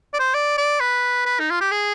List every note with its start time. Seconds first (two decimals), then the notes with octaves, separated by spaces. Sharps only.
0.14 D5
0.19 C5
0.35 D5
0.58 D5
0.80 B4
1.26 B4
1.40 D#4
1.51 F4
1.61 G4
1.71 G#4